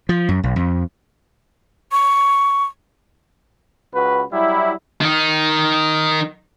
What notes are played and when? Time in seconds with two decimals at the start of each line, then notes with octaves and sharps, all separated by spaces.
0.09 F3
0.29 F#2
0.43 B1
0.56 F2
1.92 C#6
3.94 C#2 F#4 B4
4.31 F#3 G3 E4
5.01 D#3 D#4